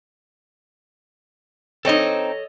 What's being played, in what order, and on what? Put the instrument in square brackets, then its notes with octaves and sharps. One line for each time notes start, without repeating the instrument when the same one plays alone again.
[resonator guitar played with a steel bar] C4 D#4 [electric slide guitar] A4 C#5 D#5